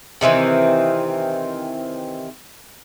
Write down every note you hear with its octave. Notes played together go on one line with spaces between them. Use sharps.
C3 D#3 E3 C4